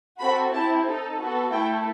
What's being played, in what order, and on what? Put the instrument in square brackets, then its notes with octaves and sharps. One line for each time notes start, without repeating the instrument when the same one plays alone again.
[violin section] C4 F#4 A4 B5
C4 E4 G4 A5
D#4 A4
B3 F#4 A4
A3 E4 A4 G5